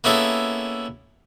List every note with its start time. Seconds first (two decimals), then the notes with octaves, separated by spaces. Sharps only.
0.04 A#3 B3 C#4 E4 G#4 A4